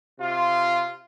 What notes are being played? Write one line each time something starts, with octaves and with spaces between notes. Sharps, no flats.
C3 F4